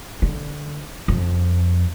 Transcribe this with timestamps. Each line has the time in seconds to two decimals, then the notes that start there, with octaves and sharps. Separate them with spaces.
0.22 D3
1.08 F2